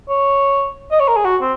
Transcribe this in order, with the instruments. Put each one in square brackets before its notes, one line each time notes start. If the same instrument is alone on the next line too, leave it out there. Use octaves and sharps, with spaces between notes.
[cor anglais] C#5
D#5
C#5
A#4
G#4
F#4
C4